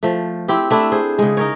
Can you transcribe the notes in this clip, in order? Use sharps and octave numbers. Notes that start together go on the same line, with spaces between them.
F3 A3
C4 E4 G4
A3 D4 E4
G#4 C5
C#3 G#3
D#4 A#4 C#5